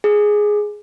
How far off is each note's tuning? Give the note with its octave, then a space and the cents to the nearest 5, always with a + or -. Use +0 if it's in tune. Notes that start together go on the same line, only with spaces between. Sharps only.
G#4 +5